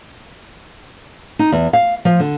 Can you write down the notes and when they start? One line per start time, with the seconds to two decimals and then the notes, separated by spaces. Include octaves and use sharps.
1.39 D#4
1.52 E2
1.73 F5
2.05 F3
2.20 D3